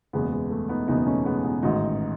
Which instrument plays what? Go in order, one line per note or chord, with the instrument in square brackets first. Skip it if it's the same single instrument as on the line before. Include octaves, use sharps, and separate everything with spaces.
[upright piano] F#1 E2 B2 G#3 B3
G#3
A3
B3 D#4
F#1 E2 B2 B3 D#4
A3 C#4
G#3 B3
B3 D#4
A1 G#2 D#3 D#4 F#4